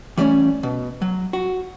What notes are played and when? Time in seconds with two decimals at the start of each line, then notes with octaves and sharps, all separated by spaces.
0.17 E3 G3 A3 A#3 C#4
0.63 B2
1.02 F#3
1.33 F#4